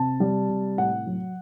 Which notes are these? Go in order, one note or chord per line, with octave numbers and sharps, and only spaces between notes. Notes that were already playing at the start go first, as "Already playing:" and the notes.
Already playing: C3 A5
G3
C3
A2 F#5
F#3